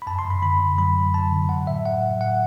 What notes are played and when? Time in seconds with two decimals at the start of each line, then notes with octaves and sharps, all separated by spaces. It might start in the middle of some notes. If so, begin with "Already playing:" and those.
0.02 B5
0.07 F#2 A5
0.19 C6
0.25 F#2
0.30 B5
0.42 D3 B5
0.61 F#2
0.78 F#3 B5
0.97 F#3
1.14 F#3 A5
1.32 D3
1.49 F#3 F#5
1.67 A2 E5
1.85 A2 F#5
2.04 F#3
2.21 A2 F#5